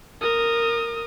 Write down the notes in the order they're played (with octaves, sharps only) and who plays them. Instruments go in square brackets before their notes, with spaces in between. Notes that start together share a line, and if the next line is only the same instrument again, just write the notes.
[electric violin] A#4 D#6